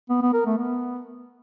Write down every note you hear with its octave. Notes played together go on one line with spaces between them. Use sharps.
B3
B3
A#4
A3
B3